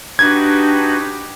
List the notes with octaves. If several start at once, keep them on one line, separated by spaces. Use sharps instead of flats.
D4 D#4 F#4 G4 B4 G#6